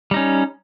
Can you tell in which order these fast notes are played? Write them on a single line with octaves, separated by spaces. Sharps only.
G3 D#4 C#4